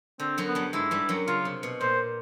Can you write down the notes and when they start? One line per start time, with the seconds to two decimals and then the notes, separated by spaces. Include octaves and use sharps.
0.19 D3 C4
0.38 F#2 F#3
0.47 B3
0.55 G2 G3
0.73 G#2 G#3 E4
0.91 G2 G3
1.09 F#2 F#3
1.27 C#3 F4
1.45 C3
1.63 B2
1.81 A#2 C5